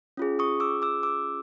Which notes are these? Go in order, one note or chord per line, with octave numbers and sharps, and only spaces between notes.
C#4 F4 G#4
C#6 D#6
D6 E6
D6 E6
D6 E6